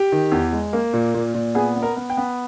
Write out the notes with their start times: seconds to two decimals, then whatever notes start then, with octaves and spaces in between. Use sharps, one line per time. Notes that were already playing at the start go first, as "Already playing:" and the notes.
Already playing: G4
0.12 D#3
0.32 E2
0.53 G#3
0.73 A#3
0.93 A#2
1.14 A#2
1.35 A#2
1.55 B3 G#4
1.76 B3
1.82 A#4
1.96 B3
2.10 G5
2.17 B3